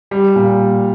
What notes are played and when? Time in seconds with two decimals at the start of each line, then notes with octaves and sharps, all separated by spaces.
0.11 G3
0.35 A#2